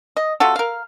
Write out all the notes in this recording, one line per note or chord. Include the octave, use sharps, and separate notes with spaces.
D#5
C3 F4 F#4 A4
A#4 F5